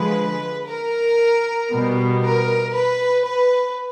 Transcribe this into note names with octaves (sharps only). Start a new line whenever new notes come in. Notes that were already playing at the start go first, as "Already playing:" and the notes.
Already playing: D3 F3 G#3 B4
A#4
B2 G3 B3
A#4
B4
B4